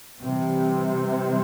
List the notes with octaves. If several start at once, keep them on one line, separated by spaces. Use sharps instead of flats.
C3 E3 G3 C4